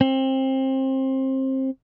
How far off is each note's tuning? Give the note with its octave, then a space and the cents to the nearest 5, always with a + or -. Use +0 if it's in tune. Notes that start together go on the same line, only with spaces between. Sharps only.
C4 +25